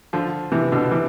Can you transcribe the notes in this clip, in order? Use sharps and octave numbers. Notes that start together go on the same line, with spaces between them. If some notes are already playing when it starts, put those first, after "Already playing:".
D3 F3
C3 E3
B2 D3
C3 E3